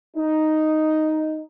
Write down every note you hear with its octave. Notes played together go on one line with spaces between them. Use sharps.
D#4